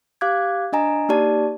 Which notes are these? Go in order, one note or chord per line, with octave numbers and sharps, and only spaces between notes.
G4 F5 D6 F#6 G#6
D4 D#5 G#5 A#5
A#3 D#4 G4 D5 A5